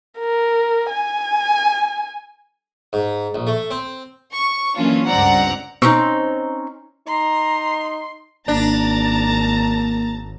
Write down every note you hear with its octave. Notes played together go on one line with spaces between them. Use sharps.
A#4
G#5
G#2
A#1
A3
C4
C#6
E3 F#3 A#3 C#4 D4 F4
C#2 G2 C4 D5 F#5 A#5
B2 C4 C#4 D#4 C#6
D#4 A#5 C6
G#1 A#3 D4 A5 A#5 A6